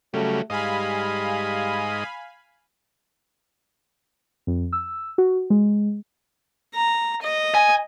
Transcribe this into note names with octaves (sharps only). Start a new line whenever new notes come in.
C#3 F#3 G3 A3
G#2 G3 D#5 F5 G#5 B5
F2
E6
F#4
G#3
A#5
D#5
G#5